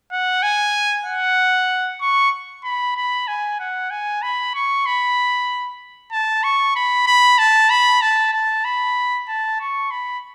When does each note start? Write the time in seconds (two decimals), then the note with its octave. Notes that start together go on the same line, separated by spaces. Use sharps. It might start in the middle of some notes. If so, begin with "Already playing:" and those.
0.11 F#5
0.43 G#5
1.06 F#5
2.01 C#6
2.64 B5
2.97 B5
3.27 G#5
3.60 F#5
3.91 G#5
4.22 B5
4.54 C#6
4.86 B5
6.12 A5
6.44 C#6
6.75 B5
7.07 B5
7.38 A5
7.70 B5
8.02 A5
8.33 A5
8.65 B5
9.28 A5
9.60 C#6
9.91 B5